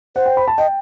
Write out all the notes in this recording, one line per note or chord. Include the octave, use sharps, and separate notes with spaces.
C5 F#5
G5
B5
A5
D#5 G5